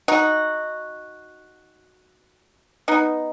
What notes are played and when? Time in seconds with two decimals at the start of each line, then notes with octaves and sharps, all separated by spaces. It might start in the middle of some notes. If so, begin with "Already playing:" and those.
0.08 D#4 F#4
2.88 B3 D#4